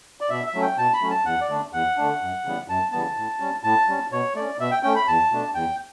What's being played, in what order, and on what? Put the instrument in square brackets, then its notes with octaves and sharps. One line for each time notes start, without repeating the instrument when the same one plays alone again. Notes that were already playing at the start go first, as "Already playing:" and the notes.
[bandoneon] D5
B2 E5
E5
F#3 A3 C#4
G5
B2 A5
B5
F#3 A3 C#4
A5
E2 F#5
D5
D3 A3 D4
E2 F#5
D3 A3 D4
F#2
C#3 E3 G3 B3
F#2 A5
C#3 E3 G3 B3 A5
A2
G3 C#4
A2 A5
G3 C#4
B2 C#5
A3 C#4 D5
B2 E5
G5
A3 C#4 G5
B5
E2 A5
B2 A3 D4
E2 G5